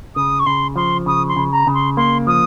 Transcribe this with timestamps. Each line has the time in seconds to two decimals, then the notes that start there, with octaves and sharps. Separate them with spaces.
0.15 C#3 D#6
0.39 C#6
0.46 C#3 C6
0.76 F3 C6
1.06 C#3 D#6
1.28 C6
1.36 C#3
1.52 A#5
1.67 C#3
1.74 C6
1.96 A#3 C6
2.27 F3 D#6